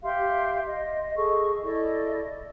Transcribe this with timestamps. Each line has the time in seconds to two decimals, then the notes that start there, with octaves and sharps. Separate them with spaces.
0.02 G4 E5 F5 C6
0.65 D#5
1.16 G#4 A4 D#5 C#6
1.63 E4 A4 D5 D#5